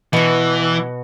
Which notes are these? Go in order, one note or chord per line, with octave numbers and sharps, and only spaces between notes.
B2 E3 F#4